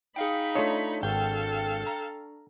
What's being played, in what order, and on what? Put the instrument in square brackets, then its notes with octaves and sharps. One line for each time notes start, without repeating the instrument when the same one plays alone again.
[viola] D#4 B5 [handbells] G#4 F5 G5
[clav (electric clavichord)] A3 F4 D#5 [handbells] D4 C#6 [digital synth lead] C#5
[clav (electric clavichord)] G#1 [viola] A4 F5 [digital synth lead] G5
[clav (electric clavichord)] A#5